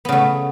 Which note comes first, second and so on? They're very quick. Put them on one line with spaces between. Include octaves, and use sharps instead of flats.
B3 C#3 A3